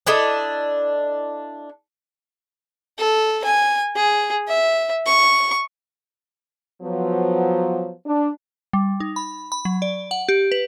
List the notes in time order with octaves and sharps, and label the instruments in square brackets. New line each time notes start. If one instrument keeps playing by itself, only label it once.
[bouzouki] D4 E4 A4 D#5
[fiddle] A4
G#5
G#4
E5
C#6
[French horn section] F3 F#3 B3
D4
[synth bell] G3
D#4
B5
B5
F#3
D5
F#5
G4
B4